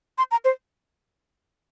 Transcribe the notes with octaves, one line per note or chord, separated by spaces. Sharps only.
C6
A#5
C5